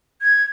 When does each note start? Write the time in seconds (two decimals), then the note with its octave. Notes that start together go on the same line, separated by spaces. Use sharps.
0.22 G#6